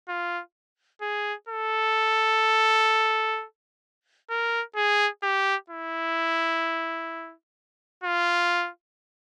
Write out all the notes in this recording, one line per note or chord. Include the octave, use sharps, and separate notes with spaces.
F4
G#4
A4
A#4
G#4
G4
E4
F4